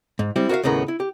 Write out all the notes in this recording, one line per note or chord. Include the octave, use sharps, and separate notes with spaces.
G#2
G3 G#3 C4 E4
F#4 A#4 C#5 E5 F5
D#2 A2 C#3 B3 A#4
E4
G4